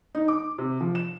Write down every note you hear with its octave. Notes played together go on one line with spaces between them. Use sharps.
D#4
D6
C3
F3
E7